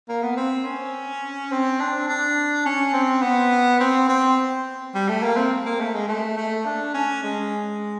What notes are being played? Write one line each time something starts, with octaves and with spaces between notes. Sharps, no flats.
A#3
B3
C4
C#4
C4
D4
D4
C#4
C4
B3
C4
C4
G3
A3
A#3
C4
A#3
A3
G#3
A3
A3
D4
C#4
G#3